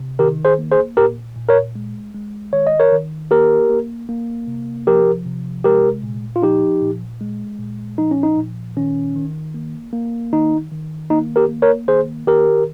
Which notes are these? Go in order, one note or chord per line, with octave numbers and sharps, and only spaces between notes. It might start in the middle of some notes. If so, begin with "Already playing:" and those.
Already playing: C3
D#3 G4 A#4
G#4 C5
A#3
G#4 C5
A#2 G4 A#4
A#2
A#4 C#5
G#3
G#3
D#3 C#5
D#5
A#4 C#5
D#3
A#3 G4 A#4
A#3
A#3
C3
F3 G4 A#4
C3
G#3 G4 A#4
A#2
F4
F3 D#4 G4
A#2
G#3
A#2
F3 D#4
C#4
D#4
A#2
D#3 C#4
D#3
A#3
A#3
D#3 D#4
D#3
A#3 D#4
G4 A#4
A#3
A#4 C#5
D#3 G#4 C5
D#3 G4 A#4